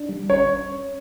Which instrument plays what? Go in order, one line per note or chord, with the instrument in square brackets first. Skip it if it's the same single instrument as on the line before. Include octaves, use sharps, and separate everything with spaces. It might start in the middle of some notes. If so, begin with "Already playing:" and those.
Already playing: [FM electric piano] D4
G3
[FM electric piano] C#4 [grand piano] C#5